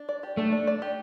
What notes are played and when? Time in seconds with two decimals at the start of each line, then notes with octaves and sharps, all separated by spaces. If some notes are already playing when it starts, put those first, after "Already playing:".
Already playing: D4
0.09 D5
0.23 G4
0.37 A3 D4
0.52 D4
0.67 D5
0.82 G4